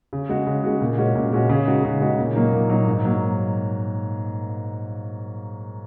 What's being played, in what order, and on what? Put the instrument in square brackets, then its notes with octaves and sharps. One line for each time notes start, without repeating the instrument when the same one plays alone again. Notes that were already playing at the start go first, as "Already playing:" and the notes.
[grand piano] C#3
G#3 F#4
C#3
G#3 F#4
A#2
G#3 C#4 F#4
A#2
G#3 C#4 F#4
C#3
G#3 D#4 F#4
C#3
G#3 D#4 F#4
A#2
F#3 A#3 D#4
A#2
F#3 A#3 D#4
G#2
F#3 A#3